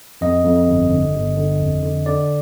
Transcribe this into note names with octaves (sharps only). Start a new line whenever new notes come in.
F2 D#5
F2
G1
D3
G1
D3
F2
D3
D3 D5